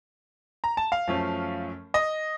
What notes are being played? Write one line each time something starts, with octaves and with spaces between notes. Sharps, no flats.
A#5
A5
F5
F#2 F3 A3 C#4
D#5